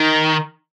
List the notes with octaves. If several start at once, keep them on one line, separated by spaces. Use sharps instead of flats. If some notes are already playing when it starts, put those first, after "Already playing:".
Already playing: D#3